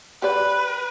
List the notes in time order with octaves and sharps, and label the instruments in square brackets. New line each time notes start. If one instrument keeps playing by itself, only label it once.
[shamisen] G4 D5 [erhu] B4